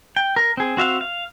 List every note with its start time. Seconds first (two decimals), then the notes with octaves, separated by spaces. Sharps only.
0.16 G5
0.36 A#4
0.57 C4 G#4
0.77 C4 F#4 E5 F5
1.01 F5